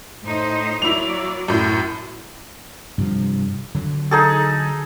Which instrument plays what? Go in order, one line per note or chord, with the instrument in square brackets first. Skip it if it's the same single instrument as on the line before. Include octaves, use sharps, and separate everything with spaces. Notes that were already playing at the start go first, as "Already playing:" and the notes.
[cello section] A2 D#4 C5
[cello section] F#3 A#3 D5 [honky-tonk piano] E4 F7
[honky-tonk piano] F#2 A2
[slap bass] G2 C3 F3
D3 F#3
[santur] D#4 G#4 A4